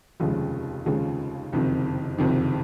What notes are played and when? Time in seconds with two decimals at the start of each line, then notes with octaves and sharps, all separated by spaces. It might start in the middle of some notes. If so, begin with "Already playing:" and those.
0.20 F1 D#2 C#3 F3 G#3
0.86 F1 D#2 C#3 F3 G#3
1.53 F#1 F2 C3 D#3
2.18 F#1 F2 C3 D#3